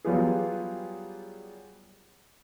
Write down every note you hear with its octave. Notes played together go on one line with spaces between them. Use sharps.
F#3 G3 B3 F4 G4 G#4